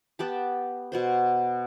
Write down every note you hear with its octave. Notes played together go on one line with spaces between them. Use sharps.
B3 G4 A5
B2 B3 C5